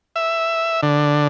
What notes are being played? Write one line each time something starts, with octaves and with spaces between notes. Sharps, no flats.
E5
D3